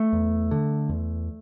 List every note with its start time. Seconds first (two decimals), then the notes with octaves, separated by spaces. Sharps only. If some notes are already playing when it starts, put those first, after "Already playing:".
Already playing: A3
0.13 E2
0.51 D3
0.89 E2